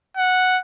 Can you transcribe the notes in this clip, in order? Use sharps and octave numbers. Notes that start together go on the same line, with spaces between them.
F#5